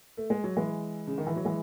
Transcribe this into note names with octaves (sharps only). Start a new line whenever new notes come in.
A3
G#3
F#3
E3 G#3
C#3
D#3
E3
F#3
E3 G#3